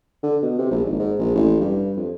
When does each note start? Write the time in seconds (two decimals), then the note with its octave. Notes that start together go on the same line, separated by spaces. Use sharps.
0.23 D3
0.42 B2
0.58 C3
0.71 A#1
0.85 G#1
0.99 G#2
1.19 A#1
1.35 A1
1.61 G2
1.96 F2